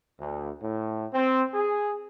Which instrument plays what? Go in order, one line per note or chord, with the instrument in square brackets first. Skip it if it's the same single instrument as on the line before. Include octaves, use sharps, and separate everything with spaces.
[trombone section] D2
A2
C4
G#4